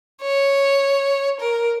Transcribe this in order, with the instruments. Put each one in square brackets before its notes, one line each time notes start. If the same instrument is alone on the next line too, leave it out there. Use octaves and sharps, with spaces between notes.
[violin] C#5
A#4